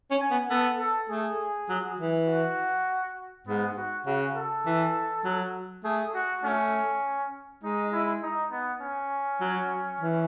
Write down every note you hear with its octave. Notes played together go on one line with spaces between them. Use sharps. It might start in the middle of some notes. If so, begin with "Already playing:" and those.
C#4
G#5
B3
B3 A4
A4
A3 G#4
F#3
E3
F#4
G#2 B3
F#4
C#3 F#4
A4
E3
F#3
A3 G#4
F#4
A3 C#4
G#3 D#4
E4
D#4
B3
C#4
F#3
E3